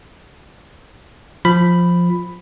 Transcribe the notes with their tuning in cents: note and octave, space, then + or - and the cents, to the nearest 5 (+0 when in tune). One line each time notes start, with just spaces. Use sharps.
F3 +5 B5 +5